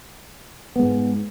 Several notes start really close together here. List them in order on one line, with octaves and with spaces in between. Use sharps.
B3 G#3 G#2